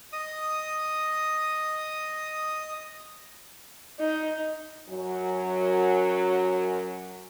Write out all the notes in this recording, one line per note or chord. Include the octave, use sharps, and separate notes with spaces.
D#5 D#6
D#4
F#2 F#3